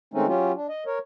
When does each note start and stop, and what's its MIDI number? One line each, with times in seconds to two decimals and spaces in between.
0.14 0.26 51
0.14 0.26 56
0.14 0.26 57
0.14 0.26 60
0.14 0.26 61
0.14 0.26 63
0.27 0.52 54
0.27 0.52 61
0.27 0.52 65
0.27 0.52 67
0.56 0.67 62
0.69 0.84 75
0.86 0.99 70
0.86 0.99 73